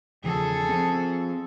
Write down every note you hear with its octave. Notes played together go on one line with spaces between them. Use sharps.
E2 C#3 F3 G#4 A4
F3 C4